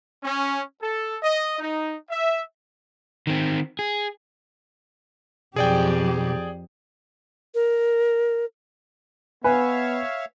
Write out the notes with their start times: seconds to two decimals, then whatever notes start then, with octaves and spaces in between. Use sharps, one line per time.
0.24 C#4
0.80 A4
1.23 D#5
1.59 D#4
2.10 E5
3.27 D#3 C4
3.79 G#4
5.56 B1 F2 G4 G#4 D5 G5
7.54 A#4
9.44 B3 B4 C#5 E5 F5 G#5